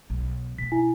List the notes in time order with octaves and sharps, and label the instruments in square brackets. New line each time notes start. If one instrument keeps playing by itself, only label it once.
[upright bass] B1
[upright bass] B2 B3 [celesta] B6
[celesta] E4 G#5